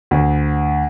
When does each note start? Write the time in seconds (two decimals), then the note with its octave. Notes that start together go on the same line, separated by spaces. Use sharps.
0.11 D2